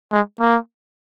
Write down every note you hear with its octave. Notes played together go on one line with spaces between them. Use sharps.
G#3
A#3